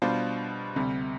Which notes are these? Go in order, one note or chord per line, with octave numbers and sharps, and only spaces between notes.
B2 G3 D4 F4 C5
D2 C3 G3